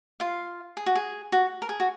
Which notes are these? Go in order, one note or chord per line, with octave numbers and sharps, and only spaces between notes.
F4 F5
G#4
F#4
G#4
F#4
A#4
G#4
F#4